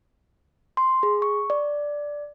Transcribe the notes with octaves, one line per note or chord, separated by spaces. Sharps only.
C6
G#4
C#6
D5